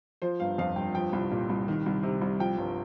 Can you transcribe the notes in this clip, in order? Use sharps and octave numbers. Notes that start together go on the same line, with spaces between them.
F3 C5
G1 F5
F2 F5
G1 G5
F3 G5
C2
A#2
C2
D#3
C2
C3
C2
F3 G5
G1